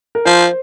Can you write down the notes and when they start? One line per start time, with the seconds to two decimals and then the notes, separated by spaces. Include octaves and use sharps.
0.15 A#4
0.25 F3 C5